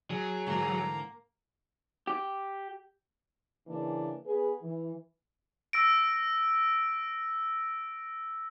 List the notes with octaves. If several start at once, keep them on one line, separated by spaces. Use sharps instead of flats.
F#3 G#4
G#2 D3 E3 A#3
G4
C#3 E3 A#3 D4
B3 G#4 B4
E3
E6 A#6 D7